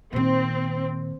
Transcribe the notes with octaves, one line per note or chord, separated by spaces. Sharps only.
A#2 D#3 C4